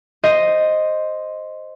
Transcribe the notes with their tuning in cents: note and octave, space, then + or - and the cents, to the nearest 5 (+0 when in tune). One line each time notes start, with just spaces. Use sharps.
C5 +0 D#5 +0